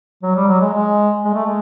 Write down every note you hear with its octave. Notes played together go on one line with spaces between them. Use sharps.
F#3
G3
F#3
G#3
G#3
G#3
A3
G#3